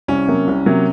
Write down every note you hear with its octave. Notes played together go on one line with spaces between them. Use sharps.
C2 C#4
C3 F#3 A#3
C2
C3 F#3 A#3